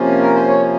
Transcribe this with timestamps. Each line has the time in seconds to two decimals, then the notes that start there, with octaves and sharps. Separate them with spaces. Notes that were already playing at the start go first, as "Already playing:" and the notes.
Already playing: C3 F3 A#3 C#4 F4
0.22 A#4
0.34 C5
0.48 C#5